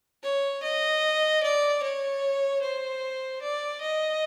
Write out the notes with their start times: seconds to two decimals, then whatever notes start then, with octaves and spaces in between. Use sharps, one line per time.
0.23 C#5
0.63 D#5
1.43 D5
1.83 C#5
2.62 C5
3.42 D5
3.81 D#5